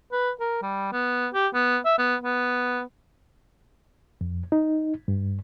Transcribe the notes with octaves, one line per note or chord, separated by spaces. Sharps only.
B4
A#4
G3
B3
G4
B3
E5
B3
B3
F2
D#4
G2